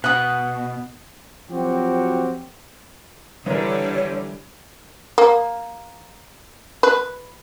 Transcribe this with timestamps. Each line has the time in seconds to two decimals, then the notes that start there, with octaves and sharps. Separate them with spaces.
0.04 B2 F#5 D#6
1.50 F3 F#3 C4 F#4 G4
3.46 D3 E3 G3 A#4 C#5
5.18 A#3
6.83 B4